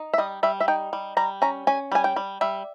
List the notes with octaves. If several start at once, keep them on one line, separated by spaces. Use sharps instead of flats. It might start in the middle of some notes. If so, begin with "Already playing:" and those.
Already playing: D#4
E5
G3 D#5
G3 E5
E5
D#4 G5
G3
G3 A#5
C#4 A#5
C#4 G#5
G3 G#5
G5
G3
G3 E5